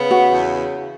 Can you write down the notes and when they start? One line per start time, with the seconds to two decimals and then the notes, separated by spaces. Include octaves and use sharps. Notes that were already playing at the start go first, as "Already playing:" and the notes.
Already playing: C#3 B3
0.11 F#4
0.30 E2